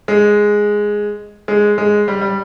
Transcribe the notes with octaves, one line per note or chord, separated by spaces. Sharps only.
G#3
G#3
G#3
G3
G3